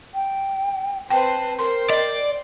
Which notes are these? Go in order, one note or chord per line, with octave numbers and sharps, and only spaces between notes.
G5
C4 B4 C5 G5 A5
A#4 C5 G5 C6
D5 D#5